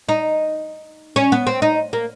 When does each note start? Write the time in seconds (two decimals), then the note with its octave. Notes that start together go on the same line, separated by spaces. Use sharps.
0.09 D#4
1.16 C#4
1.32 B3
1.47 C4
1.62 D#4
1.93 A#3